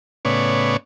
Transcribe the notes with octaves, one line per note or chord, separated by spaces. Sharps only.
A2 C#3 B3 C#5 D5